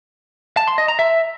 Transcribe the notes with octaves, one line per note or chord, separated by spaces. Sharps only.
A5
C6
D#5
A#5
E5